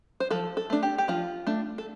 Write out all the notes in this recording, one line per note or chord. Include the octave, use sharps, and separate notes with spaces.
C5
F3 A4
A4
A3 D4
G4
G4
F3 F4
A3 D4
A4